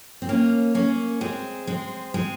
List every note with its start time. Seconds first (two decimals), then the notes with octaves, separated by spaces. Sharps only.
0.22 C4
0.29 A#3 C#4
0.75 A#3 C#4
1.21 G#3 C4
1.67 G#3 C4
2.14 G#3 C4